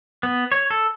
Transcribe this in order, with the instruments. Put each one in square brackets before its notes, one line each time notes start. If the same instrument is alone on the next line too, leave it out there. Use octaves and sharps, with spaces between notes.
[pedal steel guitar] B3
C#5
A4